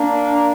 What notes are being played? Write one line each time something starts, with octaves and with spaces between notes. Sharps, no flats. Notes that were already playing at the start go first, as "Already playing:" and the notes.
Already playing: A#3 D4